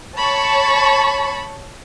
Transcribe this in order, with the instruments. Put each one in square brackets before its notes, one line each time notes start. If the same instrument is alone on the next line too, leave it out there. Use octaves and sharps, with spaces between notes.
[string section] C#5 A5 C#6 [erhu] B5